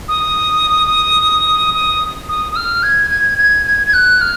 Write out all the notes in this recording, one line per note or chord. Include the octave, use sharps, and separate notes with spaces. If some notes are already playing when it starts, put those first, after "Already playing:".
D#6
D#6
D#6
D#6
F6
G#6
G#6
G#6
G#6
G#6
F#6
F6